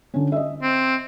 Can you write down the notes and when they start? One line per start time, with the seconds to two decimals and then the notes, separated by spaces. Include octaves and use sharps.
0.14 D3 C#4
0.32 D#5 E5
0.62 C4